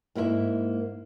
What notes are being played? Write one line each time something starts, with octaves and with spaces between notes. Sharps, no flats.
G#2 A#3 E4 A#4 E5